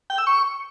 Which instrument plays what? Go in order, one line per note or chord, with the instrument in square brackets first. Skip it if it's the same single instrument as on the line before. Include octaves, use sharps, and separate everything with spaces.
[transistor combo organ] G5
E6
C#6